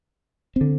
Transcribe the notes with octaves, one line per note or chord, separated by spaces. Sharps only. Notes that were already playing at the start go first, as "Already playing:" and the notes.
D3 C4